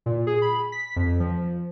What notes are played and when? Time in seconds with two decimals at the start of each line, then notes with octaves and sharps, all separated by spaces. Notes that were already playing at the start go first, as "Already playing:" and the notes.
0.06 A#2
0.27 G#4
0.42 B5
0.72 B6
0.96 F2
1.20 F3